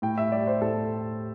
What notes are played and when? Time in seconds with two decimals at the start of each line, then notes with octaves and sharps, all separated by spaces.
0.02 A2 G5
0.18 E5
0.32 G3 D5
0.47 C5
0.61 A2 A4